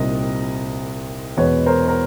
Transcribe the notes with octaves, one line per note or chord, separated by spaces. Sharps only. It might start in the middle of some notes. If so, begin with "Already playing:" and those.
Already playing: C2 A#2 G3 C4 D#4 D#5
E2 B2 G#3 B4 C#5
A#4 C5
A#4